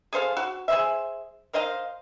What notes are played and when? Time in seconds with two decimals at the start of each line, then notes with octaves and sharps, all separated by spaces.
0.13 G#4 A4 C5 F5
0.37 F#4
0.68 G#4 C5 E5
1.53 A#4 C5 D#5 F5